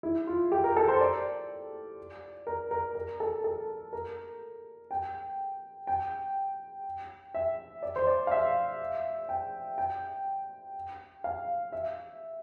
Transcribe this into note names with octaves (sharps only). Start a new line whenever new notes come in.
E4
F4
G4
A#4
A4
C5
D5
A#4
A#4
A#4
A4
A4
A#4
G5
G5
E5
D5
C5
D5
F5
E5
G5
G5
F5
E5